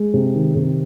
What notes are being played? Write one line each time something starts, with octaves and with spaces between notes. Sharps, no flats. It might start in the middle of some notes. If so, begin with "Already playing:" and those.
Already playing: G#3
C3
D#3
C3